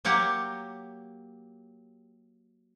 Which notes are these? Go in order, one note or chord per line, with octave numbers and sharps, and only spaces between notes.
F#3 A#3 G4 F#5